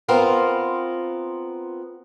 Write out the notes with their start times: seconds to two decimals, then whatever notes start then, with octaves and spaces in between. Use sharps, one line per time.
0.08 B3 C4 F4 A#4